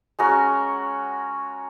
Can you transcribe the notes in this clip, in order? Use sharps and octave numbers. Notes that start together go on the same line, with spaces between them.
G#3 C#4 F#4 A#4